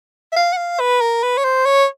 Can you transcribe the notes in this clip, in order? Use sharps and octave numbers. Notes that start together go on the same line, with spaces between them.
E5
F5
F#5
F5
B4
A#4
B4
C#5
C5
C#5